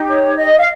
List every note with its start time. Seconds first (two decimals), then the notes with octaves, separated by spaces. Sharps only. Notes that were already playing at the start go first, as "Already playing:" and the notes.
Already playing: D#4 G4
0.09 C#5
0.36 D#5
0.58 F5